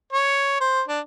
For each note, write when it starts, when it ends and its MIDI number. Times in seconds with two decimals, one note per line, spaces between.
0.13 0.56 73
0.61 0.82 72
0.88 1.00 62